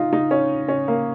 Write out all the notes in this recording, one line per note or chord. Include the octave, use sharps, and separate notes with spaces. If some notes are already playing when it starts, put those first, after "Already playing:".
Already playing: D#4 F4
D#4
C#4
C#4
A#3